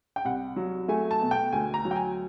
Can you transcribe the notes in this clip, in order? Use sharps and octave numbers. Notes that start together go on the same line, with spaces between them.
G5
C2 F#5
F#3
A3 G#5
A5
B2
G5
D2 G#5
A#5
F#3
G5
G#5